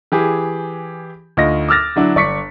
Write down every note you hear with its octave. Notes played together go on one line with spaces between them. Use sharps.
E3 G4 G#4
D2 D#4 F4 D#5 A#6
D6 E6 F6 A6 A#6
D3 F#3 D4 E4
G1 D5 C#6 B6 C#7